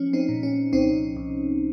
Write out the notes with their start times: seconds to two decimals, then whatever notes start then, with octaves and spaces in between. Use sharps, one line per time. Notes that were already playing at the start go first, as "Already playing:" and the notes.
Already playing: F3 C#4
0.13 C4 D#4
0.29 A#2
0.43 C#4
0.72 C2 C4 D#4
1.17 C2